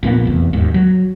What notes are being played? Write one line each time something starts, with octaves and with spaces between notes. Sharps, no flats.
A#1 A#2 A#3 B3
F1 E2
D#2 G#2
F#3